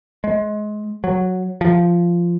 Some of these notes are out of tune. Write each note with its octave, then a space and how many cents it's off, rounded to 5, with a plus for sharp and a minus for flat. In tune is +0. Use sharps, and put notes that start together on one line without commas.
G#3 +25
F#3 -5
F3 -10